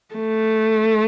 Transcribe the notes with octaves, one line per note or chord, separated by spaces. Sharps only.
A3